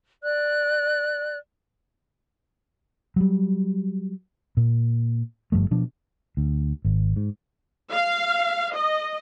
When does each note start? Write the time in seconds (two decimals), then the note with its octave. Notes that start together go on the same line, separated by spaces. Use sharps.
0.22 D5 F#6
3.16 F#3 G3
4.57 A#2
5.52 G1 G2 F3 A3
5.71 B2 F3 D4
6.37 D2
6.85 G#1
7.16 G#2
7.92 F5
8.75 D#5